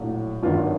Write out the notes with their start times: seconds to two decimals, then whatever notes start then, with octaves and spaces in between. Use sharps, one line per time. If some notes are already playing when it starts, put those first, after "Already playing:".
Already playing: A#1 A2 F#3
0.43 G#1 G2 D#3 F#3 F4